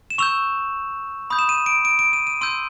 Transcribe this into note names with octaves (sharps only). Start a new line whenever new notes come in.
E7
C#6 E6 G6 F7
B5 D#6 G6
E7
D#7
D7
D7
D7
D#7
D#7
C6 E6 G6 D#7